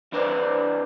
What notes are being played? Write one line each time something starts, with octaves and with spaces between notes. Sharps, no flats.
E3 D4 B4 C5 D5